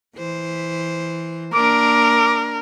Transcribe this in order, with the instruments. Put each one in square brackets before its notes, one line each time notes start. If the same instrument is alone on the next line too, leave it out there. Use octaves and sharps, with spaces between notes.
[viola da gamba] E3 C5
[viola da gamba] A#3 D4 [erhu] A#4 [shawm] D6